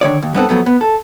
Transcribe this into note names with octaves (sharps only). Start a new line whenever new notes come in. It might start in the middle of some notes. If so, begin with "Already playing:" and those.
D3 D#3 C#5 D5
D#2
G2 B3 C4 A4
F2 F#3 A3 B3
B3
A4